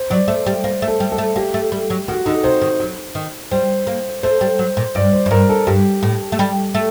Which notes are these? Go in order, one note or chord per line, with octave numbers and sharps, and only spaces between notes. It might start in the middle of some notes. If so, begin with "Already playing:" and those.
Already playing: C5
F#3 D5
A3 C5
G3
A#3 C5
A3
A4
G3
A4
A3
A#3 G4
A3
G3
F#3
D#3 F#4
D3 D#4
C3 C5
D#3
F#3
D#3
G3 C5
A#3
A3 C5
G3
F#3
A#2
G2 D5
C5
F#2
G2 A#4
A4
G2 G4
A2
A3
G3
A3